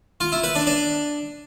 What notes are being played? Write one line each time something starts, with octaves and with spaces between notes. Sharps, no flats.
F4
E4
B4
D4
D4